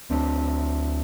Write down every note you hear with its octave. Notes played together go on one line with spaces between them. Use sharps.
D2 C4 D4